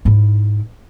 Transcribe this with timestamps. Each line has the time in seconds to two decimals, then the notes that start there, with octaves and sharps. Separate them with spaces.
0.05 G#2 E4